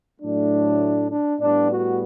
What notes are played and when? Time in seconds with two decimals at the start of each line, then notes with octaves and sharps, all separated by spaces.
0.21 A2 F#3 A3 D4
1.10 D4
1.39 A2 G3 B3 D4
1.70 F#4